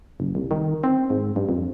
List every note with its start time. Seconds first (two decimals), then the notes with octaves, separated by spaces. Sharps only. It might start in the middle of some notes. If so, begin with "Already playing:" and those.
0.20 F#1
0.35 C2
0.51 D#3
0.84 C4
1.10 G#2
1.36 G2
1.49 F2